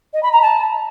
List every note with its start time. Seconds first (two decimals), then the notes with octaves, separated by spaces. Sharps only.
0.13 D#5
0.23 B5
0.32 A#5
0.41 A5